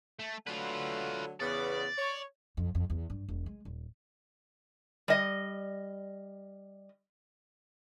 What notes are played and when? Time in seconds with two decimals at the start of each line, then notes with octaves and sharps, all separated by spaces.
0.19 A3
0.47 D3 F#3 A3 F4 B4
1.40 E2 C#3 B3 D5
1.98 C#5
2.57 F2
2.75 F2
2.90 E2
3.10 G2
3.29 E1
3.46 G#3
3.65 D#1
5.08 G3 D#5